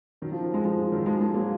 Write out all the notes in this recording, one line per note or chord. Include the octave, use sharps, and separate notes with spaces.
D#3 F#3
F3
F3
F3 G#3
F3 G#3
F3
D#3 F#3
F3 G#3
F3 G#3
F#3 A#3